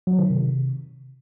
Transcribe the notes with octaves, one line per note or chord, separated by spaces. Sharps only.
F#3
D#3
C3